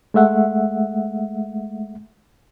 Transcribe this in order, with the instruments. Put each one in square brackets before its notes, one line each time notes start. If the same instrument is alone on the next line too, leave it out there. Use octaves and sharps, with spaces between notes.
[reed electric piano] G#3 A3 E5 F#5